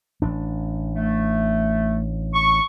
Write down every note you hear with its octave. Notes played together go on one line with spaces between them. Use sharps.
A1 D4
A3
C#6